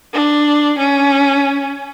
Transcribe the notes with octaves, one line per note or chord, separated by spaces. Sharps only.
D4
C#4